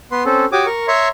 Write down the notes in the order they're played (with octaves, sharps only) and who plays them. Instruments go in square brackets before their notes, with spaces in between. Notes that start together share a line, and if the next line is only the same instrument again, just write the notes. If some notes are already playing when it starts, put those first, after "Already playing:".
[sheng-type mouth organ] B3 B4 C6
C4 C#4 A4
F#4 G4 C#5 D6 D#6
A#4 C#6
C#5 E5 A#5 C6 C#6